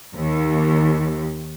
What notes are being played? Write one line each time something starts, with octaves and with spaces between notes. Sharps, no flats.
D#2